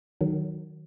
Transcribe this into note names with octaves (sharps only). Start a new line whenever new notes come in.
D#3 F#3